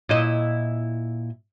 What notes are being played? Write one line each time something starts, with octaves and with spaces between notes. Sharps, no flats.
A#2 E4 D#5